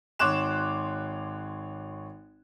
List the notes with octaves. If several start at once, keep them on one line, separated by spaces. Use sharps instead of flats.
G#1 C#5 C6 D6 F#6 E7